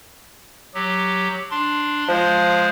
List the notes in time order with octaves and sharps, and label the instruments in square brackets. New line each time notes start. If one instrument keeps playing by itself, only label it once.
[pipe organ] F#3 G4
D4 C6
[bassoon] F3 [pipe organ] G#3 C5